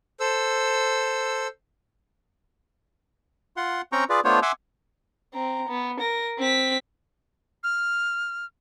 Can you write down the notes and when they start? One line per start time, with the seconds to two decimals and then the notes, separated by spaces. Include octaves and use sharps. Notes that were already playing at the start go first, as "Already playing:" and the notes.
0.20 A4 C5 E6
3.57 F4 F#5 C6
3.92 C4 C#4 G5 A#5 C#6
4.10 F4 G#4 B4 D5
4.25 A3 B3 D4 F4 C5 C#5
4.42 E5 F#5 G#5 C6 D6 E6
5.34 C4 A#5
5.68 B3
6.00 A#4 A#6
6.39 C4 B6
7.64 F6